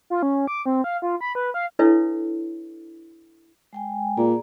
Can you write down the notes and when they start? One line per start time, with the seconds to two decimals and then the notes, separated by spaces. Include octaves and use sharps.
0.10 F4
0.23 C#4
0.47 D6
0.66 C4
0.84 F5
1.02 F4
1.21 B5
1.35 B4
1.54 F5
1.79 D4 E4 A4 B4 C#5 E5
3.73 G#3 G5 G#5
4.17 A#2 G#4 D5 A#5